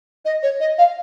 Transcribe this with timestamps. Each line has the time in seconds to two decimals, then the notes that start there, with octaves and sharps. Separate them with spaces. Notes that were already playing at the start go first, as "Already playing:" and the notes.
0.25 D#5
0.43 C#5
0.60 D#5
0.78 F5